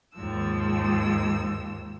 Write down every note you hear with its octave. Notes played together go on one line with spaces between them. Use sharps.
D#2 G#2 F3 E6